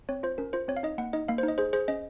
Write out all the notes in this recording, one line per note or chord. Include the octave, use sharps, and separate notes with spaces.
C4 C#5
F4 C5
C#4 A#4
F4 C5
C4 C#5
F5
D#4 D#5
A#3 F#5
D#4 D#5
A#3 F5
C5
D#4
D#5
G#4 C5
G#4 C5
C#4 D#5